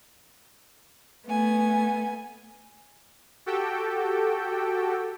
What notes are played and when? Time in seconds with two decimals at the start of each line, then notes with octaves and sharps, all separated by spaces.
1.25 A3 B3 G#5
3.46 F#4 G4 A4 G5